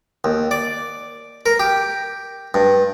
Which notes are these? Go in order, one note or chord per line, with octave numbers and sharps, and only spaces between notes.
D#2
D5
A#4
G4
G2